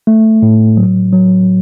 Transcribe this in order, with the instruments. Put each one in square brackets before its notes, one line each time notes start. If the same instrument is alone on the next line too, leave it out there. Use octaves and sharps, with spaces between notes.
[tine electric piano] A3
A2
F#3
F#3